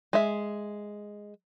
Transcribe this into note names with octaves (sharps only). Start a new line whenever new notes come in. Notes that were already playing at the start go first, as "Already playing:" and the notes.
G#3 E5